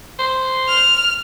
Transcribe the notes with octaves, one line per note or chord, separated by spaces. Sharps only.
C5
F6